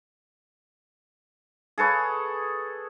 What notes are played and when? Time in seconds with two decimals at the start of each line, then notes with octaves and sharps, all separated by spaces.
1.78 G#4 A4 B4 C#5